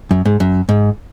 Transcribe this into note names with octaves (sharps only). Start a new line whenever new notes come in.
F#2
G#2
F#2
G#2